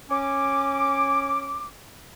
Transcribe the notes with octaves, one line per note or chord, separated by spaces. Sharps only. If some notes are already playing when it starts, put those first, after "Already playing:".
C#4 D6